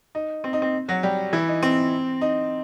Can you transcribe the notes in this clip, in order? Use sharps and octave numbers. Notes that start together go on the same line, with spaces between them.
D#4
C4
D#4
C4
F#3 F#4
G3 G4
E3 E4
D#4
C4
D#4